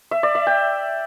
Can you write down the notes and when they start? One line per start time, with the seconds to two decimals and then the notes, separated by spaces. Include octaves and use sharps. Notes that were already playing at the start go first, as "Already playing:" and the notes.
0.11 E5
0.23 D5
0.35 E5
0.47 G5